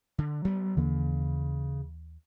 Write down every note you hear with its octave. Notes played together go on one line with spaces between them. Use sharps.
D3
F#3 G3 B3
D#2 C#3 E3 A#3